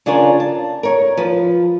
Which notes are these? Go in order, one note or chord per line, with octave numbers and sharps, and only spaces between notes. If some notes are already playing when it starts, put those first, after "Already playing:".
C#3 D4 F4 A#4 C#5
A5
A#4 C#5
F3 B4